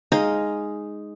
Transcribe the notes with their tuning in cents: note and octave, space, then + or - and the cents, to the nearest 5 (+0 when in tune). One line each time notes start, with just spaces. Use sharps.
G#3 +0 D#4 +0 F5 +0